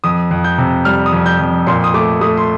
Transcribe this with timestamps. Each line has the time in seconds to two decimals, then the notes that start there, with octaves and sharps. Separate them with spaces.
0.04 F2 D#6
0.31 F2
0.44 G6
0.58 C3
0.85 G3 F6
1.06 D#6
1.12 F2
1.26 G6
1.40 F2
1.67 A#2 C6
1.84 D#6
1.94 A3 D6
2.21 A3 D#6
2.37 C6